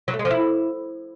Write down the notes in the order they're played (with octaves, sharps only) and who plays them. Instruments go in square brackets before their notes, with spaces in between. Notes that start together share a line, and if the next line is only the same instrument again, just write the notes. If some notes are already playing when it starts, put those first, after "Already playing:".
[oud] F#3
A3
G#3
F3
E4